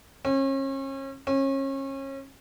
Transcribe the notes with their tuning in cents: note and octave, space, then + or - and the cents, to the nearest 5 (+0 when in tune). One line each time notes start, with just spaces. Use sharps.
C#4 -35
C#4 -30